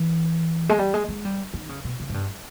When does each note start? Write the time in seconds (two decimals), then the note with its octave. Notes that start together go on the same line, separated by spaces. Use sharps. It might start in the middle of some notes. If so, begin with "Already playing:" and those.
Already playing: E3
0.69 G#3
0.79 G3
0.94 G#3
1.09 G#3
1.25 G3
1.54 D#3
1.69 C#3
1.84 B2
2.00 C#3
2.09 G#2
2.14 G2